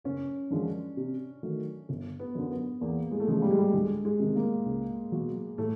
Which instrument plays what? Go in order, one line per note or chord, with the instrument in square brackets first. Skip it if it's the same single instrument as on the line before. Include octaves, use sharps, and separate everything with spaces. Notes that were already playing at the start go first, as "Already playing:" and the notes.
[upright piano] F#1 [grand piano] C#4
[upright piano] F#2 D3 F3 G#3 [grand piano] D4
[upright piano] C3
D#3 F#3 A3
G1
[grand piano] B3
[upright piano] F#2 D3
[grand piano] B3
[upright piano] E2 [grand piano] A#3
[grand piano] G#3
A3
[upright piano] C#3 F3 [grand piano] G#3
[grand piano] G3
G#3
G3
[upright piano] D2 [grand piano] G#3
[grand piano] G#3
[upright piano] C3 D#3
[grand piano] A#3
[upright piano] C#2
B2 F#3
[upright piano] A2 [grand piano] A3